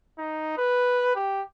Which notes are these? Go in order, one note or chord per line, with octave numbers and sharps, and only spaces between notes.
D#4
B4
G4